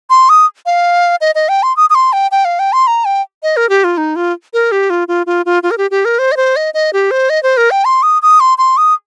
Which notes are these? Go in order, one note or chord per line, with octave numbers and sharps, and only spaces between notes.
C6
D#6
F5
D#5
D#5
G5
C6
D#6
D#6
C6
G5
G5
F5
G5
C6
A#5
G5
D#5
A#4
G4
F4
D#4
F4
A#4
G4
F4
F4
F4
F4
F4
A#4
G4
G4
A#4
C5
D#5
C5
D#5
D#5
G4
C5
D#5
C5
A#4
G5
C6
D#6
D#6
C6
C6
D#6